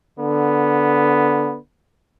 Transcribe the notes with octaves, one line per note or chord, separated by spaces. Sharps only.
D3 B3